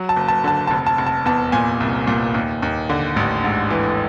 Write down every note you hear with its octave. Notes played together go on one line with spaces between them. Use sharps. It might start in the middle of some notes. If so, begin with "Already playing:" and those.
Already playing: F#3
A5
F#1
A5
D3 A5
F1 A5
A5
F1
A5
E2 A5
A#2 G#5
C2
A#2
D#2
D#2
D3
A1
G#2
E3